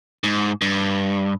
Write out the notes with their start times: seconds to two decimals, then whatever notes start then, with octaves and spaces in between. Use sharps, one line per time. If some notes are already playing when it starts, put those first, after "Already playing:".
0.24 G#2
0.62 G2